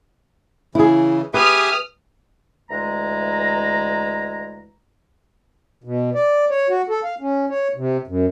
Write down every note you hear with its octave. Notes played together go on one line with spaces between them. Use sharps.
C#3 E3 E4 G#4
G4 G#4 B4 E5 D#6 F6
D2 E3 G#3 A#5
B2
D5
C#5
F#4
A4
F5
C#4
C#5
C3
F#2